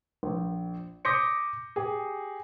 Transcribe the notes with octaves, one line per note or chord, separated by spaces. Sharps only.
A#1
D6 D#6 G6 A#6 B6 C#7
G4 G#4